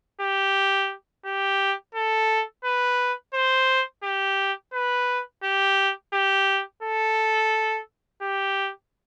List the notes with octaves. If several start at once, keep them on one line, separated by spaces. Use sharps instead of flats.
G4
G4
A4
B4
C5
G4
B4
G4
G4
A4
G4